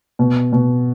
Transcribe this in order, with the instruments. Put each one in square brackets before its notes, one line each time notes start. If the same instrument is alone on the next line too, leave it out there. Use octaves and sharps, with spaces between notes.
[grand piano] B2
B2